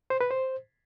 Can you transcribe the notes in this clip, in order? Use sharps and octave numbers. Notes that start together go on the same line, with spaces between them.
C5
B4
C5